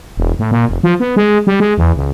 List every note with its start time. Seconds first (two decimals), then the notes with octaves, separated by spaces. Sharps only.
0.17 E1
0.39 A2
0.51 A#2
0.69 F1
0.83 F3
1.00 B3
1.16 G#3
1.47 G3
1.60 G#3
1.78 E2
1.96 C#2